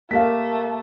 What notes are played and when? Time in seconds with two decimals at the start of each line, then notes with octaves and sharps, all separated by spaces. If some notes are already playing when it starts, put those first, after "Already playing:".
0.11 A3 A#3 G4 F5 B6